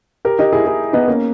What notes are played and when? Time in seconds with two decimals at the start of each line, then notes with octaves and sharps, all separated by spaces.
0.25 G4 A#4
0.39 D#4 G4
0.52 E4 G#4
0.66 E4 G#4
0.93 B3 D#4
1.07 A#3 C#4